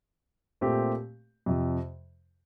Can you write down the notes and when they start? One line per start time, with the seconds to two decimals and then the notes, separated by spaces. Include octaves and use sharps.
0.61 A#2 A3 C4 G4
1.46 F2 C3 F3